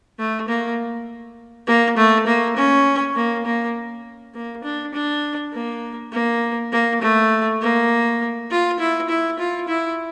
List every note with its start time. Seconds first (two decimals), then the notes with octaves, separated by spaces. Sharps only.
0.19 A3
0.48 A#3
1.67 A#3
1.97 A3
2.27 A#3
2.57 C#4
3.16 A#3
3.45 A#3
4.34 A#3
4.64 D4
4.94 D4
5.53 A#3
6.12 A#3
6.72 A#3
7.01 A3
7.61 A#3
8.50 F4
8.80 E4
9.09 E4
9.39 F4
9.68 E4